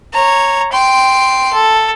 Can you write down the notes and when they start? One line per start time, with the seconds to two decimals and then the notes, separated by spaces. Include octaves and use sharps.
0.13 C#5 A#5
0.72 G5 C6
1.53 A4